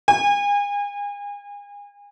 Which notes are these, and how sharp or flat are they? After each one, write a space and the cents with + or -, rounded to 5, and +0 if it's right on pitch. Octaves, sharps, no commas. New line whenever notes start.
G#5 -35